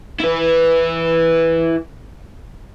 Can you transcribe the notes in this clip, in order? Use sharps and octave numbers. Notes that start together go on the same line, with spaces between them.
E4 B4